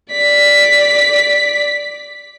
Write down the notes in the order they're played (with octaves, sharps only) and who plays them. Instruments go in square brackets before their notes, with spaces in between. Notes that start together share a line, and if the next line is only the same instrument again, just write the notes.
[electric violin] D5 B6